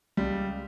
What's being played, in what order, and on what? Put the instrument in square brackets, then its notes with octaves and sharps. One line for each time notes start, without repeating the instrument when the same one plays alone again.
[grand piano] C#2 G3